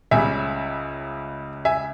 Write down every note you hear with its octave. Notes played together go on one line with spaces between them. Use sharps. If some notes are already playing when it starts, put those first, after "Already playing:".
C#2 C#3 G3 E5 G#5
E5 G#5